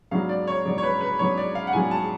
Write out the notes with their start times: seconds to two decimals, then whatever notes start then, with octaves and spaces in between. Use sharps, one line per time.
0.11 G#2 F#3 B3 D4 F5
0.29 D5
0.47 C#5
0.65 G#2 F#3 B3 D4 D5
0.78 C#5
0.83 B4
1.01 B4
1.19 G#2 F#3 B3 D4 C#5
1.37 D5
1.55 F5
1.67 F#5
1.73 G#2 F#3 B3 D4 G#5
1.91 A5